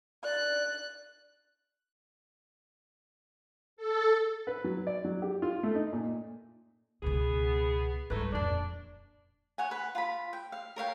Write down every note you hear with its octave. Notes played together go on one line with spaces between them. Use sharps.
D5 F#6
A4
B4
F#3
D5
F#3
G4
F4
A3
D#4
A#2
C#2 B2 B3 G#4
G#2 F#3 G3 A3 B4
D#1 F2 D4
C#5 F#5 G#5
B4
F4 A5 B5
G5
F5
A#4 C#5 F5 G5